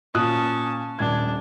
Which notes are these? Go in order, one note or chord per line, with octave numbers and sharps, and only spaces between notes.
A#2 C#4 A5 D#6 F#6
D#1 D4 G#6